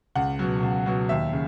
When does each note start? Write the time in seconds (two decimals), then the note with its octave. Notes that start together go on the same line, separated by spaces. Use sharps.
0.15 C#2 F#5
0.39 B2 F#3
0.63 C#2
0.86 B2 F#3
1.09 D#2 E5
1.33 C#3